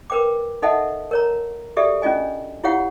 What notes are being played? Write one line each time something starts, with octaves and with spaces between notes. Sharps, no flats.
A#4 B4 G5 D6
D#4 A4 D#5 E5 F#5 A5
A#4 C#5 A#5
F#4 G4 A4 D5 E5
C#4 D4 F4 D#5 G#5
E4 F4 G4 C#5 F5 F#5